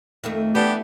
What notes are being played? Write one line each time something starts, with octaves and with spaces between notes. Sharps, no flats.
F2 D#3 A3
E3 B3 D4 G4